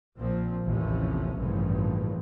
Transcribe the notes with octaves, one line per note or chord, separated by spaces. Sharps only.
A#1 A#2 F3 C4
A1 D#2 C3 F3 A3 C#4
A1 G2 A#2 C#3 F3